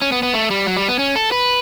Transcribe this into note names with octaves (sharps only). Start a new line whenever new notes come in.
C#4
B3
B3
A3
G3
F#3
G3
B3
C#4
A4
B4